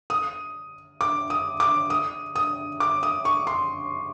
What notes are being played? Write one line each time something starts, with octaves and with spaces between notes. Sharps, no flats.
D#6
D6
D#6
D6
D#6
D#6
D6
D#6
C#6
C6